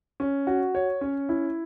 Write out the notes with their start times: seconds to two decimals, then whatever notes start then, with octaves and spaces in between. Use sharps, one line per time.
0.20 C#4
0.47 F#4
0.75 C#5
1.01 C#4
1.29 E4